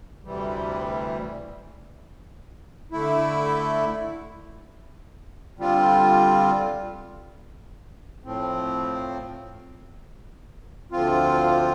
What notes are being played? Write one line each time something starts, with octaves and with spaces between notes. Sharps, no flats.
D2 C3 E3 G3
D3 A3 E4
D3 G3 C4 F4
A2 F3 C4
D2 D3 F3 C4 F4